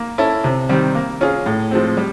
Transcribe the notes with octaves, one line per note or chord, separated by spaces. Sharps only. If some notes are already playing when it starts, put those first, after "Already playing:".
Already playing: A#3
C#4 E4 A4
C3
D#3 G3 C4
A#3
C#4 F4 G#4
A2
F3 G#3 C4
G3